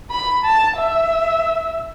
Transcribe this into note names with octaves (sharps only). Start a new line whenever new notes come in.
B5
A5
E5